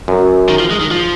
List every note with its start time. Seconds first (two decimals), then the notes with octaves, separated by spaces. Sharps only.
0.08 F#2
0.49 D#3
0.60 F3
0.71 G#3
0.81 D#3
0.91 F3